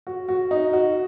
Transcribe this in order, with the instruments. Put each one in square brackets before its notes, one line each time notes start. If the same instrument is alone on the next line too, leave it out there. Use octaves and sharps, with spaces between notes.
[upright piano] F#4
F#4
D#4
F#4